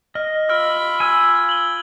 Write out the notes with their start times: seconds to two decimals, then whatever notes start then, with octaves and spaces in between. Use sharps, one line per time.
0.15 D#5 F6
0.49 F4 B5 E6 F6 D7
1.00 G#5 E6 G#6
1.49 F#7 G7